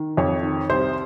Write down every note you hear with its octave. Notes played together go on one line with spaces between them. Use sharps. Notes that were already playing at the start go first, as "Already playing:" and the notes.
Already playing: D#3
F2 C#5
D#3
C2 C5